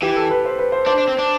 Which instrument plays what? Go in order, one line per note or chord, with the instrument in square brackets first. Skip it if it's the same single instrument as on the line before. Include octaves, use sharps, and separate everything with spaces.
[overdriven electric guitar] E3 [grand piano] G4
[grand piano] A4
B4
C5
B4
C5
[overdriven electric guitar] D4 [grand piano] C5
[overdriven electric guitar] D4
C4
D4